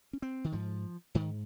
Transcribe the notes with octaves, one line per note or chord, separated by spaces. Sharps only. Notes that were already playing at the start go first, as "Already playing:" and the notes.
C#4
C4
D#3
G#2 F3
G#2 D#3